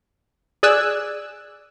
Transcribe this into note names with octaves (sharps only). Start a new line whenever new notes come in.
G#4 D5 G#5 E6 F#6